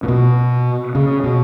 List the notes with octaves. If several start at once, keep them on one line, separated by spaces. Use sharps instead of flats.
A#2
B2
C#3
B2